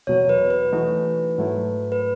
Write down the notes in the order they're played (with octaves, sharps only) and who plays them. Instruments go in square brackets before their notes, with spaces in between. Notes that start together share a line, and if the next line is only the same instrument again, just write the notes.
[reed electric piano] E2 B2 F#3 [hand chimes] C#5
[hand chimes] B4
B4
[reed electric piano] E3 A3 D#4 F#4
G#2 F#3 A3 E4
[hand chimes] B4